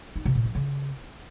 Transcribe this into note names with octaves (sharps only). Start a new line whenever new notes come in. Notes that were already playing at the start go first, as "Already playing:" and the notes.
D#4
C3
A#2
F3
C#3